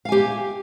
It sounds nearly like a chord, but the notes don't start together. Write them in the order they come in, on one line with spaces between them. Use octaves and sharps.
F5 G#5 G4